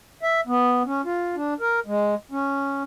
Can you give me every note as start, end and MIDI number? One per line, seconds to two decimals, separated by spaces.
0.23 0.41 76
0.47 0.83 59
0.86 1.01 61
1.05 1.35 65
1.35 1.54 62
1.60 1.80 70
1.86 2.15 56
2.31 2.83 61